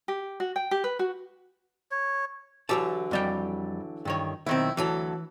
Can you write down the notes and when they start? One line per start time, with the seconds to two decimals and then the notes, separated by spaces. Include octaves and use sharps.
0.08 G4
0.40 F#4
0.56 G5
0.71 G4
0.84 B4
0.99 F#4
1.91 C#5
2.69 D3 E3 F#3 G4 A5
3.11 F2 G3 G5
4.05 G2 D#3 C#5
4.46 B1 D#3 C4 E4
4.77 D2 E3 F#3 A4